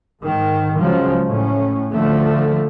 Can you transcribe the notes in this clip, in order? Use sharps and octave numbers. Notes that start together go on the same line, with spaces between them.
G#2 D#3
C#2 C#3 F3 F#3 G#3
A2 C#4
D3 F3 A3